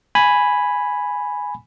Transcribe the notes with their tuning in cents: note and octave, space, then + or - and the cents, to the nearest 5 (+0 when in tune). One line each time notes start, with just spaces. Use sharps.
G#5 +0 B5 +0